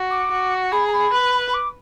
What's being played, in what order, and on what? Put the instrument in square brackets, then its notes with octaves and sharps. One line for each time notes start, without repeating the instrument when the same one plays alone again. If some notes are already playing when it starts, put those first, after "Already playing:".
Already playing: [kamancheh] F#4
[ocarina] D6
[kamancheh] F#4
[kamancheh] G#4 [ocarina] B5
[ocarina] A#5
B5
[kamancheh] B4
[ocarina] B5
D6